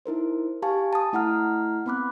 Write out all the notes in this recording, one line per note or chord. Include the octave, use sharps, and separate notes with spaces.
D#4 E4 A#4 C5
G4 F5 G#5 A5 C#6
A5 D#6
A3 E4 F#5 A#5 F6
B3 C4 B5 D6 F#6